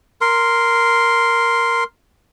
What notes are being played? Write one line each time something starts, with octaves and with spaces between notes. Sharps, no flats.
A#4 C6